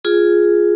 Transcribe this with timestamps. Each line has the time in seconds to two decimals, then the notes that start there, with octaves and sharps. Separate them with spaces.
0.05 F4 G#4